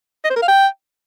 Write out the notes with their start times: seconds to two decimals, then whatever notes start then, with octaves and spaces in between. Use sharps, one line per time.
0.24 D#5
0.30 C5
0.36 A#4
0.42 F5
0.48 G5